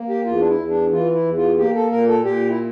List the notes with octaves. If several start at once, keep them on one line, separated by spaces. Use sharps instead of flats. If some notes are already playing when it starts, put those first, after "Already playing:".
Already playing: A#3
G4
E2 F4
D4
E4
E2
D4
E3 F4
E4
E2
F4
A#3 G4
A4
A#2 A#4
A4
A#2 G4
E4